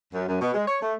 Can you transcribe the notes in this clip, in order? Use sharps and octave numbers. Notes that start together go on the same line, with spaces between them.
F#2
F#2
B2
G#3
C#5
A3